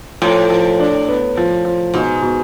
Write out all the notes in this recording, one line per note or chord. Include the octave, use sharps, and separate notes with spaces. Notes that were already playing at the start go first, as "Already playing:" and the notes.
A2 F3
F3
D4
B3
F3
F3
G#2 B2
B2